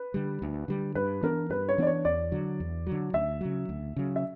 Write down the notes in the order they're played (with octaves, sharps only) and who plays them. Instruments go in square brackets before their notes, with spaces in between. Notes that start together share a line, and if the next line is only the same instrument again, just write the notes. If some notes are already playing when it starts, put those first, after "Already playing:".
Already playing: [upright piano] B4
[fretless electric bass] D3 G3
D2
D3 G3
[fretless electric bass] G2 [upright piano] B4
[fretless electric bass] E3 B3 D4 [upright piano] A#4
[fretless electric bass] G2 [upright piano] B4
[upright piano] C#5
[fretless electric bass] E3 B3 D4 [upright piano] D5
[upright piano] C#5
[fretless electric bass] E2 [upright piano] D5
[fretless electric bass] D3 F#3
E2
D3 F#3
[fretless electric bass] D2 [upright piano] E5
[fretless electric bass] C#3 F#3
D2
C#3 F#3
[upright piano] E5